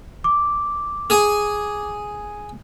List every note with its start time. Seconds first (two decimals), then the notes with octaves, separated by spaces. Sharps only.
0.24 D6
1.10 G#4 G#5